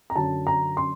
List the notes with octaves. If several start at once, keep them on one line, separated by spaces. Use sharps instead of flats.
A#5
F#2 D3 F#3 A5
A#5
C6